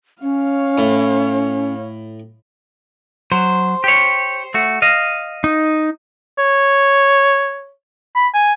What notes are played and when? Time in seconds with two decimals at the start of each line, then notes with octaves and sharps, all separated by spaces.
0.22 C#4 C#5 F5
0.78 A2
3.32 F#3 C5
3.84 G4 C#5
4.54 A3 F#4
4.82 D#5 F5
5.44 D#4
6.38 C#5
8.16 B5
8.34 G#5